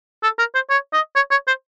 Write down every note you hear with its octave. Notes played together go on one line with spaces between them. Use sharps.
A4
A#4
C5
C#5
D#5
C#5
C#5
C5